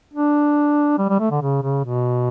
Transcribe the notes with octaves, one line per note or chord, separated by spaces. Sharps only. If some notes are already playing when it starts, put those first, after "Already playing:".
D4
G3
G3
A3
D3
C#3
C#3
B2